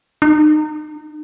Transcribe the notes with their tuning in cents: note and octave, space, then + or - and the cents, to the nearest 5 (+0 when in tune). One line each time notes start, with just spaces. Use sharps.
D#4 -35